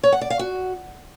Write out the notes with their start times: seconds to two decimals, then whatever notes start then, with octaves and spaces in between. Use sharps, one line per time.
0.03 C#5
0.12 F#5
0.21 D5
0.30 F5
0.39 F#4